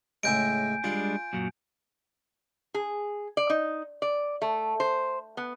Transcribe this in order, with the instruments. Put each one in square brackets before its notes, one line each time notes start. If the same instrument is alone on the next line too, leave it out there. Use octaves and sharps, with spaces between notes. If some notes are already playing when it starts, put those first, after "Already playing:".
[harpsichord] A2 C#3 G#3 [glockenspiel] G#5 G6 D7
[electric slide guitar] G3 G#3 D4 [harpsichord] F4
[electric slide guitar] F#2 A#2 F#3
[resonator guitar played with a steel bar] G#4
D5
D#4
D5
A3
C5
B3